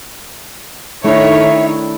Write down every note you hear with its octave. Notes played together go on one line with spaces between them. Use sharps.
D#3 A3 D4 E4 C#5 E5